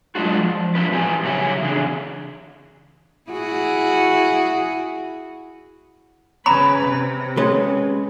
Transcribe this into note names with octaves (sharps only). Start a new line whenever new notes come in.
F#3 G#3 D4 F4 F#4
F3
F3 C4 D4 B4
A#2 E3 G4 B4 G#5
C#3 F#3 C#5 E5 G#5
C#3 E3 D4 G#4
E4 F#4 G#4
C#3 B4 A#5 B5
C3
G#3 C#4 B4